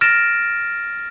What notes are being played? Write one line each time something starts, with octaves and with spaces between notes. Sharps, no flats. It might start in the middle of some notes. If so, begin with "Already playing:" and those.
F6 A6 A#6 D7 E7